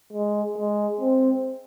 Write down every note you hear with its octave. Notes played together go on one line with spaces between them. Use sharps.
G#3
G#3
C4